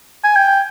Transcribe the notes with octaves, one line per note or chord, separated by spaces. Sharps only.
G#5
G5